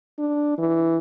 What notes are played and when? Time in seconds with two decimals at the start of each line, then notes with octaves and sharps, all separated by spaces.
0.18 D4
0.58 E3